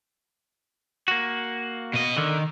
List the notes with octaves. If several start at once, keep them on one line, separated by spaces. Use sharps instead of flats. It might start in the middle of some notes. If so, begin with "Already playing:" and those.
A#3 F#4
B2 D#5
D3 D#3